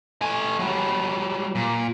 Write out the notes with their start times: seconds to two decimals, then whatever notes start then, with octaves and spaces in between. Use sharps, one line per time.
0.22 A3 G#5
0.59 F#3 G3
1.55 A#2